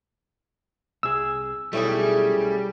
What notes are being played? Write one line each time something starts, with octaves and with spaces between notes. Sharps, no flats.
C2 G#4 E6
B1 G3 A3 C#4 E4 G#4 G5